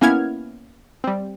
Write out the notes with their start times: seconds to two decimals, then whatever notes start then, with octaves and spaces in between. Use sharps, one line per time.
0.01 A#3 B3 C#4 E4 F6 G#6
1.04 G3 C4